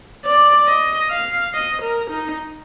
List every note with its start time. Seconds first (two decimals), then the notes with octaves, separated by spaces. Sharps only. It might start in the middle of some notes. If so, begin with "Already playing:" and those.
0.25 D5
0.67 D#5
1.11 F5
1.54 D#5
1.82 A#4
2.10 D#4